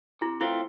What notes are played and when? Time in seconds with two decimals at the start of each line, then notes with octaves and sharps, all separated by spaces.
0.21 C3 E4
0.41 E3 A3 C4 E4 F4